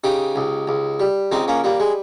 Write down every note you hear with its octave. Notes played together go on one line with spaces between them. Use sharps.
C#3 D#4 G4
C#2
C#2
G3
C#2 C4 D#4
A#3 C#4
G3 A#3
G#3